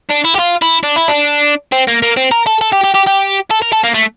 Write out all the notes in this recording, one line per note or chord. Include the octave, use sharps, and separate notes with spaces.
D4
E4
G4
F4
E4
D4
E4
D4
C4
A#3
A#3
C4
A#4
A4
A4
G4
G4
G4
G4
A4
A#4
A4
A#3
A3